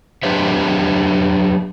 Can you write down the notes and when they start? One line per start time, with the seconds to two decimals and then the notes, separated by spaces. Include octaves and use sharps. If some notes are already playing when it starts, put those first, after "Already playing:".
0.23 F#3 D4 G4 B4 C5 E5